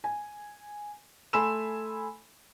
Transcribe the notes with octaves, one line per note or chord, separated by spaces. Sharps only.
G#5
A3 G#5 B5 C6 E6 E7